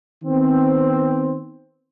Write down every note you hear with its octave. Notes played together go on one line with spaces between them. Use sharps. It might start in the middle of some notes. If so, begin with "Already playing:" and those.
D#3 B3 C4